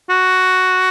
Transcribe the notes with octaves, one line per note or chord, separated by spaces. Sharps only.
F#4